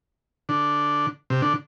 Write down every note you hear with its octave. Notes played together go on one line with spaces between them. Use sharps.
D3
C3
D3